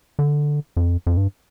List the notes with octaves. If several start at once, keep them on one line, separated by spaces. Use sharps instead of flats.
D3
F2
F2
G2